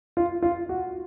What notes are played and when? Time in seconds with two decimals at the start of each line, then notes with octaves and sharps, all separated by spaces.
0.17 F4
0.42 F4
0.69 F#4